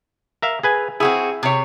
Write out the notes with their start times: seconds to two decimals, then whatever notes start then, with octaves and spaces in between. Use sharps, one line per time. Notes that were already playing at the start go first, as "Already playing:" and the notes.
0.42 A#4 E5 F5
0.63 G#4 B4 G#5
1.00 C4 E4 F#4 G#4
1.43 C3 C#5